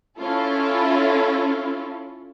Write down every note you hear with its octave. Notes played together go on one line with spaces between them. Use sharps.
C#4 E4 F4 A4